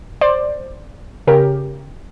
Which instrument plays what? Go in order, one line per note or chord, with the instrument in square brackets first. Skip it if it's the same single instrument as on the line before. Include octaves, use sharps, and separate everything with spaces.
[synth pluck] C5 D5
C#3 G4 A#4